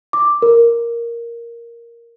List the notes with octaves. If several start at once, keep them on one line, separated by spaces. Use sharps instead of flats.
D6
A#4